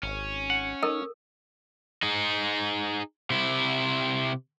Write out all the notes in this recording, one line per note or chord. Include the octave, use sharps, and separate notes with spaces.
G#1 C#4
F#5
D#4 A4 A#4
D#4 G#4
C3 E4